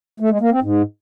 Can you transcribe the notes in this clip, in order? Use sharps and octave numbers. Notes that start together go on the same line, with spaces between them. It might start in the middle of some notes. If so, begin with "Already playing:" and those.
A3
G#3
A#3
C4
G#2